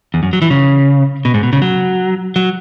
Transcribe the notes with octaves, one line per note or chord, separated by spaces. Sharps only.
E2
F#2
F#3
E3
C#3
B2
G#2
B2
C#3
F#3
F#3